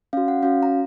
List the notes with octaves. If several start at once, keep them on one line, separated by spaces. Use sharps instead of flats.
C#4 F#4 F5
F#5
C#4 F#4 F5
A#5